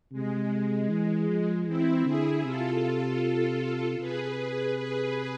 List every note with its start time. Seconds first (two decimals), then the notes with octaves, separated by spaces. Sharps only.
0.12 C3 G#3
0.89 E3
1.29 F3
1.67 E3 C4 E4
2.06 D3 E4 G#4
2.45 C3 F4 A4
3.99 C3 G#4 B4
4.77 G#4 B4